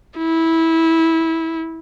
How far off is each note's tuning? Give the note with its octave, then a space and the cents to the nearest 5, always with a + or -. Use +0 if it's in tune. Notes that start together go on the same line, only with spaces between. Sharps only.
E4 -15